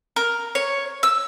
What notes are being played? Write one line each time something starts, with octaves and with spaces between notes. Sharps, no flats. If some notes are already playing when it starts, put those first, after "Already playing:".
A#4
C#5
E6